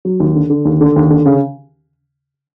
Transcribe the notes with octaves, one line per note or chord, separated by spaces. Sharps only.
F#3
D#2
D3
D3
D#2
D3
D#2
D3
C#3